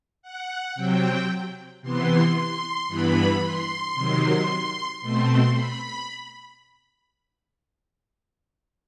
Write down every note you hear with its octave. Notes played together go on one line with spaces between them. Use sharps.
F#5
C3 F#3 C4 G5
C3 E3 B3 C6
C6
G2 E3 B3 B5
C6
C3 D#3 F#3
B2 A3 C4 C6
B5